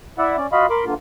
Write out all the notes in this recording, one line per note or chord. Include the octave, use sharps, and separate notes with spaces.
E4 D5 E5 F#5
C#4 D5
F4 F#4 D#5 F5 B5
A#4 B5 C6 D6
G2 D3 A#3 F4